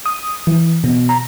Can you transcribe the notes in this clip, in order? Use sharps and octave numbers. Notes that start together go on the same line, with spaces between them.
D#6
E3
B2
A#5